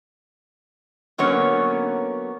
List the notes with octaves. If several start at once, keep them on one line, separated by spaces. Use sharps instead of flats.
D3 F#3 A#3 B3 C#4 C#5